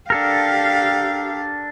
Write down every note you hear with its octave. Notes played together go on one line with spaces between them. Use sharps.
D4 G4 A4 A#4 F5